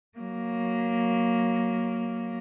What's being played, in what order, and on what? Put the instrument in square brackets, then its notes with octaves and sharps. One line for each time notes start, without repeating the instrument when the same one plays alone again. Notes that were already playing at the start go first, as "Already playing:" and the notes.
[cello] F#3 A#3